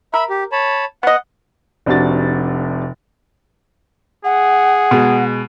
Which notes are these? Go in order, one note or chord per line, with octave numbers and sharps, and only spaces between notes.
A#4 E5 B5
G4
C#5 A5 B5
B3 D#5 F#5
F1 C3 D4 F#4 A6
G#4 F#5
B2 G#3